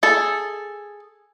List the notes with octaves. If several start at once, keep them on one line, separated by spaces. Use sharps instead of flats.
G#4 A4